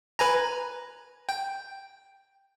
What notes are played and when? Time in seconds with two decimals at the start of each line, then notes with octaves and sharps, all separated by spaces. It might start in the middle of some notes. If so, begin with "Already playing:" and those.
0.19 B4 G#5 A#5
1.29 G5